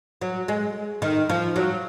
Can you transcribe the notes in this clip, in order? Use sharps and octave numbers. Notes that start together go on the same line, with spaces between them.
F#3
G#3
D#3
F3
F#3